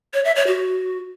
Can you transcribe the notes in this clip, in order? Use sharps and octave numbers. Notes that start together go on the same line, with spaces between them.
C#5
E5
C#5
F#4